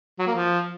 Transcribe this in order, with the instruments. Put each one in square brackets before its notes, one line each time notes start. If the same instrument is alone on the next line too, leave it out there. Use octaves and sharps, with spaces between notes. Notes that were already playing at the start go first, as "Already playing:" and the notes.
[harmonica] F#3
A#3
F3